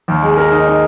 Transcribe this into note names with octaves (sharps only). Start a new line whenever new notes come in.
D#2
G#3
A#4
D#4
D#4